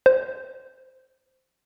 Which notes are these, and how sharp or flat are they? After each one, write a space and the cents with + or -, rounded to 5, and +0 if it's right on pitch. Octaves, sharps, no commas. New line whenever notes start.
C5 -5